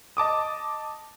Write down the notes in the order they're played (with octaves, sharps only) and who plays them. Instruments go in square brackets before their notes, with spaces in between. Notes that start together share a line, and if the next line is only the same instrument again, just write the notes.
[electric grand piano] D#5 A5 D6 D#6